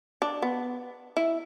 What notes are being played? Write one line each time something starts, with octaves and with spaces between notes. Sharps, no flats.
D4
B3
E4